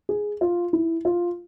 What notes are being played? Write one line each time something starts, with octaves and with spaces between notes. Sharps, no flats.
G#4
F4
E4
F4